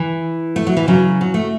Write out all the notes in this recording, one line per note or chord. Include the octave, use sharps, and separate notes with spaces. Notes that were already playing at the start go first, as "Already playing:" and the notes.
Already playing: E3
A3
F#3
E3
C#3 F#3
F#3
A3